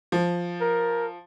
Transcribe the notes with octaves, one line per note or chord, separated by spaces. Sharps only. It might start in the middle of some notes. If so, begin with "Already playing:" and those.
F3
A#4